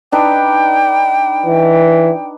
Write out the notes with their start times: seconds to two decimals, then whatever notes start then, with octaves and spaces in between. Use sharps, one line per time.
0.12 D4 D#4 B4 G5
1.46 E3